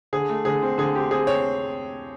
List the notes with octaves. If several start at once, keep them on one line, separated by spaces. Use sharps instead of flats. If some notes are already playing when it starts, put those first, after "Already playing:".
D3 G#4
A3
D3 G#4
C4
D3 G#4
C4 G4
C4 G#4
C4 C#5